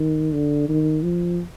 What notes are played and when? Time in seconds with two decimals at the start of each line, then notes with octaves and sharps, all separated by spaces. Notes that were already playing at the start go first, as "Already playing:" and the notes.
Already playing: D#3
0.33 D3
0.69 D#3
1.03 F3